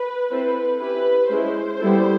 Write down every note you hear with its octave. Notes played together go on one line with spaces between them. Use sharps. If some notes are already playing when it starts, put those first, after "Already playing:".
Already playing: B4
C4 E4 A4 B4 C5
C#4 E4 G4 B4
G#3 C#4 E4 C5
G3 B3 E4 A4